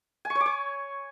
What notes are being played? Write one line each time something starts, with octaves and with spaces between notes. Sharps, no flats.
G#5
C#6
C#5
D6
C#5